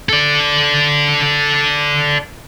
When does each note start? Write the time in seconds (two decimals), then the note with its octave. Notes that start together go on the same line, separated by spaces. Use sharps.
0.09 A4 D5